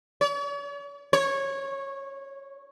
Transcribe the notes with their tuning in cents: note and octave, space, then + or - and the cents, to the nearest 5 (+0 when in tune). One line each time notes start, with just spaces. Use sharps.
C#5 +45
C#5 -15